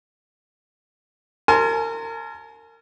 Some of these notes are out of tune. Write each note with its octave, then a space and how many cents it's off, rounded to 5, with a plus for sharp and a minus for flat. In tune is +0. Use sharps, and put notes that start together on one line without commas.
A#4 -30 G#5 +35 C6 +0